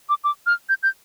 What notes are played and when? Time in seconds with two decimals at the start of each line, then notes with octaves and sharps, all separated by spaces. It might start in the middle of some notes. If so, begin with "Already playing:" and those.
0.09 D6
0.24 D6
0.46 F6
0.69 G6
0.83 G6